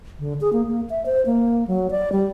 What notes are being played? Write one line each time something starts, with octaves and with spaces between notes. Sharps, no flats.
D3
G#4
A#3
A#3
E5
C5
A#3
F#3
D5
G3